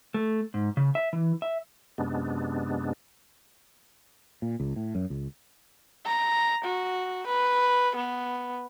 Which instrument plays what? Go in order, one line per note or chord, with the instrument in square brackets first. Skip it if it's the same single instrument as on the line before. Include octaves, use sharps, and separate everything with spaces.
[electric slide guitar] A3
G#2
C#3
E5
E3
E5
[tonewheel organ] F#2 C3 G#3 B3 D4
[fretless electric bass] A#2
C#2
A2
F#2
C#2
[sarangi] A#5
F#4
B4
B3